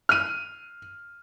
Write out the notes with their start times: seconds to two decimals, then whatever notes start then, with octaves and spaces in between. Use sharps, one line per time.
0.09 F6 D#7